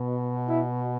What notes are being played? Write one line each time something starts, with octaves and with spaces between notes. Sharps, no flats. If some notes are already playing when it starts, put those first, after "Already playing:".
Already playing: B2
E4